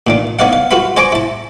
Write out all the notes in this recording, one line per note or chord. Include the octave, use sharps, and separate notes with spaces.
A#2 D#3 D4
B3 D#4 C#5 D5 F5 F#5
F5
F4 F#4 B4 F5 B5
C5 D5 G#5 A#5 C#6 D6
E4 A5